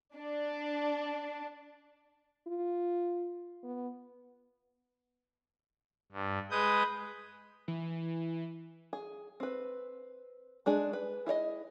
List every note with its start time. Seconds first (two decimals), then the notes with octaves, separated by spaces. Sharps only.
0.17 D4
2.47 F4
3.63 B3
6.12 G2
6.51 G#3 B4 D#6 G6
7.68 E3
8.93 G#4
9.40 C4 B4
10.66 G#3 D4 G#4
10.93 B4
11.26 E4 G#4 C#5 D#5